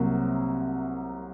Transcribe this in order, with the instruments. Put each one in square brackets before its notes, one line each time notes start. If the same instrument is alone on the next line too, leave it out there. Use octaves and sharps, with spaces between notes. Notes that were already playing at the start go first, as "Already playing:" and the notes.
Already playing: [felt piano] C2 C3 F#3 A#3